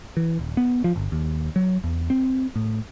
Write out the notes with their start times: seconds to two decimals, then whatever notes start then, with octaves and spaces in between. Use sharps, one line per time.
0.17 E3
0.39 D#1
0.57 B3
0.84 F3
0.96 G1
1.12 D#2
1.56 F#3
1.84 E2
2.10 C4
2.56 A2